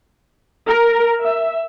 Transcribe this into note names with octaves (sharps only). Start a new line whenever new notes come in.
A#4
E5